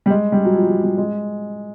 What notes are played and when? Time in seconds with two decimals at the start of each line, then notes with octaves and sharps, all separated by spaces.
0.06 G3
0.10 G#3
0.32 G3
0.45 F#3
0.55 F3
0.69 F#3
0.83 G3
0.98 G#3